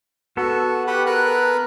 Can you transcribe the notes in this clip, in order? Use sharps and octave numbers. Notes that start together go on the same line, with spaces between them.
B3 F#4 A4
G4 B4 F#5
A#4 B4 F#6